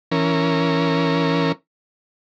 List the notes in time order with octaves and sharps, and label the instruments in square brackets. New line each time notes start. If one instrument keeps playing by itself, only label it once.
[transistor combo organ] E3 C#4 A#4